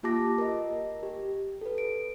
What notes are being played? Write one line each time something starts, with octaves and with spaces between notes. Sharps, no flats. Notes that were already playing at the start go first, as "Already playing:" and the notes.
A#3 F4 G4 A5 D6 A#6
A#4 D#5
G4
A4 B4
D7